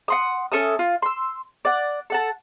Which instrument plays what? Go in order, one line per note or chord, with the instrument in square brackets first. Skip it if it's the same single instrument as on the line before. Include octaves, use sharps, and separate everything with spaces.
[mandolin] F#5 C6 D#6
C#4 A4 E5 D#6
F4
C6 E6
D5 F#5
A4 F#5 A5